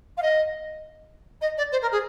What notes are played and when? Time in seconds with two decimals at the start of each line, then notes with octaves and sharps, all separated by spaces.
0.17 F5
0.22 D#5
1.41 D#5
1.57 D5
1.71 C5
1.81 A#4
1.91 G#4